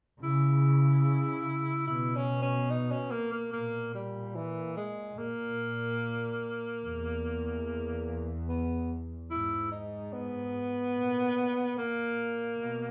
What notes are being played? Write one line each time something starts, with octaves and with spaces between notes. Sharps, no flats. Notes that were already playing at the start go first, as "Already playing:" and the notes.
C#3 E4
B2 E4
C#4
C#4
D#4
C#4
A#3
A#3
A#2 A#3
G3
E3
G#3
A#2 A#3
E2
B3
G#2 E4
D#4
B3
A#2
A#2 A#3
B2